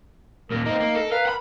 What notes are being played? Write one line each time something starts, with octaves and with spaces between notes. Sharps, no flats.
D#2 A#2 A#4
A#3 C4 D#4
A#3
A4 A#4
A#4 B4 F5
F#5 B5